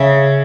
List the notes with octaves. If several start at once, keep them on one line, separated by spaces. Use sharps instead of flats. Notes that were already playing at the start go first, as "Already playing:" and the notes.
Already playing: C#3 E5